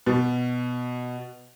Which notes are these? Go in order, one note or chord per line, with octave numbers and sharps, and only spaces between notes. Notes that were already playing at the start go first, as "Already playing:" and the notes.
B2